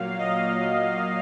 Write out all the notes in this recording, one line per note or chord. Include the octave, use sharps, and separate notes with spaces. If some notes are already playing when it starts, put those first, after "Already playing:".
Already playing: A#2 F#3 F5
D#5